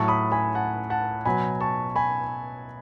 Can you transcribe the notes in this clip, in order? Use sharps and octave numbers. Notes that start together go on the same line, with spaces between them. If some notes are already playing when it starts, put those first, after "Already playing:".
Already playing: A2 F#3 A5 C#6
B5 D#6
G#5 B5
F#5 A5
F#5 A5
B2 F#3 G#5 B5
A5 C#6
G#5 B5